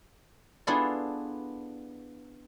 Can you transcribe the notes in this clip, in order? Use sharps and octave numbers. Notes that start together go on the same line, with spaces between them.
B3 D4 E4 F4 G#4 A4